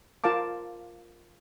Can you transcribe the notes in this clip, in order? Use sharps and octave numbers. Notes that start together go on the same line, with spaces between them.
F4 A#4 F5 A5 D6